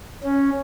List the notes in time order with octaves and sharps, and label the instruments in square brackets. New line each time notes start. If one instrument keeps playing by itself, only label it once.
[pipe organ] C#4